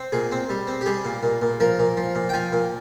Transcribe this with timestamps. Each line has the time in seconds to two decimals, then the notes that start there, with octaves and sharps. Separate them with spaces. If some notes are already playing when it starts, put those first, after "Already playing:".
Already playing: C4
0.12 A#2 G#4
0.32 C4
0.49 G3
0.67 C4
0.81 G4
0.86 G3 G#4
1.05 A#2
1.23 A#2
1.41 A#2
1.60 F3 A#4
1.79 A#2
1.97 F3
2.15 A#2
2.29 G5
2.34 F3 G#5
2.52 A#2